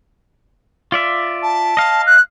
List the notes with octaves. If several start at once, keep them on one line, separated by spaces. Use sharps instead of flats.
F4 D5 E5
A5
D#5 F5
F#6